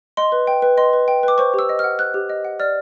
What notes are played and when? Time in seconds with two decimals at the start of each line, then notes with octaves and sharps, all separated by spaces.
0.17 D#5 C6
0.32 B4
0.47 G5
0.62 B4
0.77 D#5 C6
0.93 B4
1.08 G5
1.23 B4 D6
1.38 C5 C#6
1.54 G4 E6
1.69 D#5
1.79 F#5 F6
1.99 C5 F#6
2.14 G4
2.29 D#5
2.45 F#5
2.60 D5 F6